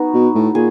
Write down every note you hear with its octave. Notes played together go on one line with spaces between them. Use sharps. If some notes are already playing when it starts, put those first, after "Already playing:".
Already playing: B3 D#4 F#4
B2
A2
A#2 G#4